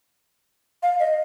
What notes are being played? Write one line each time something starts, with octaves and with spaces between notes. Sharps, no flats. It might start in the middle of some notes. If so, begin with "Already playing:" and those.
F5
D#5